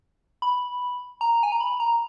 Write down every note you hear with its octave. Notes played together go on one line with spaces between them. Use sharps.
B5
A#5
G#5
A#5
B5
A#5